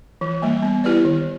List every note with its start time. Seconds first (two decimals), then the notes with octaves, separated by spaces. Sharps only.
0.21 E3
0.42 G3 A#3
0.63 B3
0.84 E4 G4 B4 D5
1.05 D#3